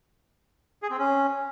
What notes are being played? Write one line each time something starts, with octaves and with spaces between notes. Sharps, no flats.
G#4
C4
C#4